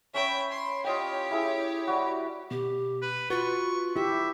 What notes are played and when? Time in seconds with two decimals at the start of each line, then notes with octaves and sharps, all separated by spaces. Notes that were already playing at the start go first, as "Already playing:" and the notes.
0.14 C#4 C#5 E5 G5 B5
0.52 C6
0.84 F4 G4 C#5 D#5 G5
1.31 E4 G#4
1.87 G3 F#4
2.51 B2 G4
3.02 B4
3.30 F4 F#4 B4 C#6
3.96 E4 G4 E5